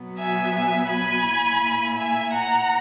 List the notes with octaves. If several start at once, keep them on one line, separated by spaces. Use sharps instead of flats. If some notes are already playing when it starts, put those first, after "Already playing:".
Already playing: B2 F#3 B3
E5 G#5
E5 G#5
G#5 B5
A#2 A#3 E4
E5 G#5
F#5 A#5